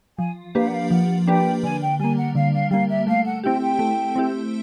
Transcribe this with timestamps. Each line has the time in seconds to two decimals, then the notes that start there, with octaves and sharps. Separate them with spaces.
0.18 F3 G#5
0.55 A#3 D4 G4 B4 F5
0.67 F#5
0.74 F5
0.90 F3 F#5
1.27 A#3 D4 G4 B4 G5
1.63 D3 G#5
1.82 G5
1.99 G3 A#3 G#5
2.18 F#5
2.35 D3 F5
2.54 F5
2.71 G3 A#3 F5
2.89 E5
3.07 A3 F5
3.25 F#5
3.44 C4 E4 G4 G5
3.62 G5
3.79 A3
4.15 C4 E4 G4